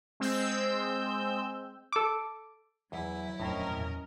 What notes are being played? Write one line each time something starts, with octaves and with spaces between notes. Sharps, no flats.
G#3 C4 E6 G6
A4 D6
E2 F#3 E4
D#1 F2 A2 C#4 D4 A#4 C5 D#5
E2 A#2